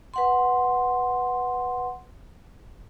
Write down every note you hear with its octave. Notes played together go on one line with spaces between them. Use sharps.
B4 F#5 C6